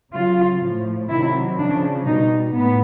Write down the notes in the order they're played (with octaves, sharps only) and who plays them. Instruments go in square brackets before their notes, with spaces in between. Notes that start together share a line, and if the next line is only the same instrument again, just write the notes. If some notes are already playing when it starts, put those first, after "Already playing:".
[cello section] C#3 F#3 F4
A2 F3
C3 D#3 F#3 E4
C#3 F3 D4
B2 G3 D#4
A2 B3